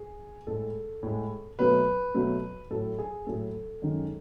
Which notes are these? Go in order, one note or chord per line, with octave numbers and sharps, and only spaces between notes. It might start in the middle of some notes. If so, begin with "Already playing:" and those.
Already playing: G#4
A2 G#3 A4
A2 G#3
B2 F#3 A3 B4
B2 F#3 A3
A2 F#3 A3 A4
G#4
A2 F#3 A3 A4
F#2 D#3 G#3